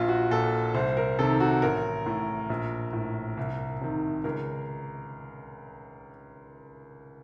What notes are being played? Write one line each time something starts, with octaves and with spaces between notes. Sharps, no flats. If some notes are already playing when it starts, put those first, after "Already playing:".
Already playing: A#1 F4
F#4
A#2 A4
C2 C5
A#4
C3 D#3 A4
F#4
A1 A#4
A2
A#1
A2
C2
C3 D#3
C#2 A#4